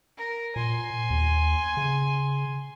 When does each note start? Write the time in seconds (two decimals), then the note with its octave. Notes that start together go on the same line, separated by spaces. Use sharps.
0.17 A#4
0.56 A#2 G#5 C6
1.10 D#2
1.77 C#3